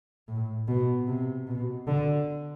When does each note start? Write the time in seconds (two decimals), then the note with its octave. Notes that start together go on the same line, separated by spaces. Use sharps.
0.28 A2
0.68 B2
1.07 C3
1.47 B2
1.87 D3